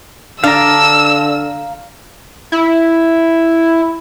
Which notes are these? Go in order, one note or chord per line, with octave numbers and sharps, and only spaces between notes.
D3 D4 F5 A#5 E6
E4